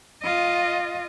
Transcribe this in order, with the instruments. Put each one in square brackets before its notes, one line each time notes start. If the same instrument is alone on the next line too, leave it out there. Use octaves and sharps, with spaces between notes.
[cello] F4 D#5